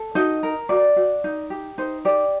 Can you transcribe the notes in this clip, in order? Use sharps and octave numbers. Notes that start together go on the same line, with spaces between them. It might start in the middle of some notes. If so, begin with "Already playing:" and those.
Already playing: A4
D#4 F#4 D#5
A#4
F#4 D5
F#4
D#4
G4
D#4 C5
G4 D5